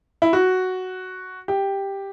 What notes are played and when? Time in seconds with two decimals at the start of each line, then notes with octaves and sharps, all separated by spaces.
0.22 E4
0.33 F#4
1.48 G4